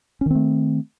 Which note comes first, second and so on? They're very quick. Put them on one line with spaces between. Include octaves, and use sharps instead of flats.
C#4 D#3 C4 A3